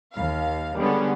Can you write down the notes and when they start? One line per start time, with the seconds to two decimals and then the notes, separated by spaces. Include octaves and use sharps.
0.12 D#2 F5
0.78 D3 G3 G#3 B3 C#4